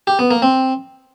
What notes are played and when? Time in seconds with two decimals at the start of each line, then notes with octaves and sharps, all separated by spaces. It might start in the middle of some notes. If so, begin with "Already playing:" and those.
0.07 G4
0.19 B3
0.31 A#3
0.42 C4